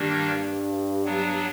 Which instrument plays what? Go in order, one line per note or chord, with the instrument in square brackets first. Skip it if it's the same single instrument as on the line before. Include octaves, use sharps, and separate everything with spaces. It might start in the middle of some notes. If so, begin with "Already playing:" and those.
Already playing: [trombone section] G2 [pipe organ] D#3 G3 A#3 D4
[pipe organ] F#3 B3 D4